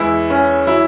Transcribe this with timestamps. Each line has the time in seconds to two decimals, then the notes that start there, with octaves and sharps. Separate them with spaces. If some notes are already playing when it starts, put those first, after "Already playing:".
Already playing: E2 E3 G#3 E4
0.30 C#4
0.67 F#3 E4